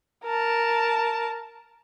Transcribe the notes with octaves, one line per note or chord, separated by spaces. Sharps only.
A#4 A5